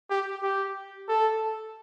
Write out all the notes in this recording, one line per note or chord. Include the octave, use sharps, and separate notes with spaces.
G4
G4
A4